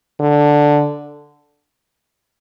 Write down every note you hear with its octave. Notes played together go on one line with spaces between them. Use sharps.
D3